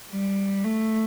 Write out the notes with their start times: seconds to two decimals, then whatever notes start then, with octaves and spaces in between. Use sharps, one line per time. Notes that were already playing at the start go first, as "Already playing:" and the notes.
0.11 G3
0.65 A3